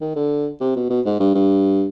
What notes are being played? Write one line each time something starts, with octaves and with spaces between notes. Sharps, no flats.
D#3
D3
C3
B2
B2
G#2
G2
G2